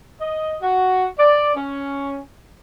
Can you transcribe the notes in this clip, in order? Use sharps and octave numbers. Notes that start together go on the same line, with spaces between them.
D#5
F#4
D5
C#4